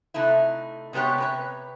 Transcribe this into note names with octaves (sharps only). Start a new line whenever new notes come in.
C3 A3 D#4 E4
C3 G#3 B3 G4 C#5
C3 B4 C#5